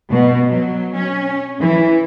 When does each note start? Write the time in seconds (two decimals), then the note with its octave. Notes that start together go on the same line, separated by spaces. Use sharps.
0.10 B2
0.49 F#3
0.95 C#4
1.59 E3